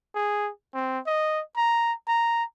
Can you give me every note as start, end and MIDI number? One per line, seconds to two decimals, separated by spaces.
0.15 0.50 68
0.74 0.99 60
1.07 1.42 75
1.57 1.93 82
2.08 2.44 82